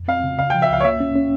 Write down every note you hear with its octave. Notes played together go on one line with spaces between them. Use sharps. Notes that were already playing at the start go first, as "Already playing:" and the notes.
Already playing: F2
C4 F5
C#3
C#3 F5
F3 G5
E5
C#2 F5
C#5
A#3 E5
C#4
C#4